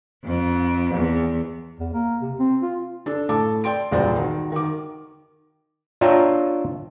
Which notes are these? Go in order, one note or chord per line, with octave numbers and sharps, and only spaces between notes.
F2
E2
E2
A#3
C3
C4
F4
D4 A4
A2 A4 A5 D6
D5 G5 C6 D7
E1 C2 A#2 F#4 C5 D5
D#3 F#4
D#3 D6
D4 F4 C#5 E5 G5 A#5